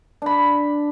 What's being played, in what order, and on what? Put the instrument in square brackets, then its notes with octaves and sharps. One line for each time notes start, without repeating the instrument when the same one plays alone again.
[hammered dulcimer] D4 B5